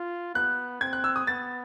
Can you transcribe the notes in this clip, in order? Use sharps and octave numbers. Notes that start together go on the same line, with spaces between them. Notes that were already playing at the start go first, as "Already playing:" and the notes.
Already playing: F4
B3 F#6
C4 G#6
F#6
E6
D#6
B3 A6